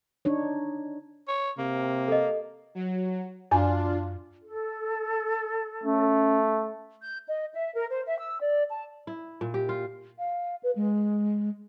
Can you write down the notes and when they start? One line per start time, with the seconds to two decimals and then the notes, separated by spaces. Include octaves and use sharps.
0.25 D4 D#4 C#5
1.28 C#5
1.58 C3 A#3
2.08 A4 D#5
2.75 F#3
3.51 F#2 D4 F4 G#5
4.43 A4
5.84 A3 C#4
7.01 G6
7.28 D#5
7.53 E5
7.74 A#4
7.90 C5
8.06 E5
8.19 E6
8.41 D5
8.69 A5
9.07 E4
9.41 A#2
9.54 G4
9.69 F4
10.19 F5
10.63 B4
10.76 G#3